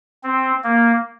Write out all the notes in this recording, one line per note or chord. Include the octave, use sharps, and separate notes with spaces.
C4
A#3